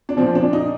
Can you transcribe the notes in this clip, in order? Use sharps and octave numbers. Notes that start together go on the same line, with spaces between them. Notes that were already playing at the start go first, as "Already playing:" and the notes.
D4
A#2 F3 C4
D4
D#4